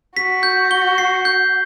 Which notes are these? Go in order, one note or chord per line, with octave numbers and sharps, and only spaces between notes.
F#4 B6
G6
G7
C7
G6